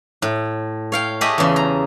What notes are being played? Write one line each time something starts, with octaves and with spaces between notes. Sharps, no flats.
A2
C#5 F5 G5
A3 G4 G#4 D#5 B5
E2 C#3
A#5